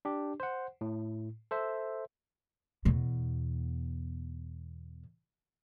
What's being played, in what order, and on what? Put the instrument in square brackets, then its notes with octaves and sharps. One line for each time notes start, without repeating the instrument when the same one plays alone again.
[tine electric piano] D4 G4
C5 F#5
A2
A4 C5 E5
[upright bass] E2 B2